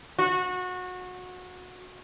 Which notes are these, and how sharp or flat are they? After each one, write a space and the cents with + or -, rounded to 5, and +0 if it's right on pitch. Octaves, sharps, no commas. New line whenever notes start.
F#4 -25